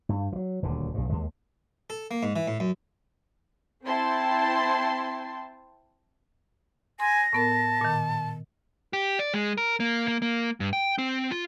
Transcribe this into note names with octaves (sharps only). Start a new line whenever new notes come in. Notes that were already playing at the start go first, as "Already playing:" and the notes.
G2
E3 F#3
D#1 D2 D3
B1 G2
D#2 G#3
A4
A#3
G#2
E3
A2
F#2
C4 E4 G5 A5 C6
G#5 C6 A#6
A2 B3 A#4 A5
A#2 D#3
G4
D5
G#3
A#4
A#3
A#3
A#3
G2
G5
C4
F4